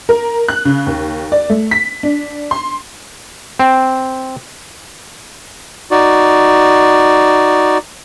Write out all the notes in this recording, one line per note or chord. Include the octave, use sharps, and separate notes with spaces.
A#4
F#6
C#3
D#2
D5
A3
B6
D4
C6
C4
D#4 F#4 D5